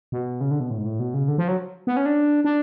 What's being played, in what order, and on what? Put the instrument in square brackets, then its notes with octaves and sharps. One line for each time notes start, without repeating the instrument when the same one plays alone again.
[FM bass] B2
C#3
D3
B2
A2
G#2
A2
B2
C#3
D3
F3
F#3
B3
C#4
D4
D4